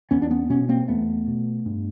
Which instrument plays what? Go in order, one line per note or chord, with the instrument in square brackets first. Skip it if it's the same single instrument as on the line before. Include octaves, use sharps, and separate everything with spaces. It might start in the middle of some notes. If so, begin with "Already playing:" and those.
[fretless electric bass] E2 B3 C#4
D4
B3 C#4
B2 B3 C#4
A#3 C4
E2 A3 B3
B2
G2